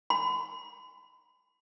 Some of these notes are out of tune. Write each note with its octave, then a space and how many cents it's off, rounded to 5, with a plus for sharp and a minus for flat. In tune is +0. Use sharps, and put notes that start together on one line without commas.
B5 +45